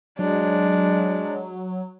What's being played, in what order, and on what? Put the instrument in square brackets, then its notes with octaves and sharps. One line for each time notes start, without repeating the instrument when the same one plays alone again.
[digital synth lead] F#3 [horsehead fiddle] G#3 D4